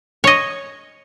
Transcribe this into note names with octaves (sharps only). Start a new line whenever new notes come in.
C#5 D#5